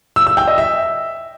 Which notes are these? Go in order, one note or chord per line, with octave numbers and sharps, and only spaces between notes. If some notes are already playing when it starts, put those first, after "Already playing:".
E6
E6
G5
D#5
E5